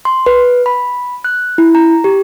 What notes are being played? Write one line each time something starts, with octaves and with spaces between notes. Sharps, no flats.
C6
B4
B5
F#6
E4
A#5
G4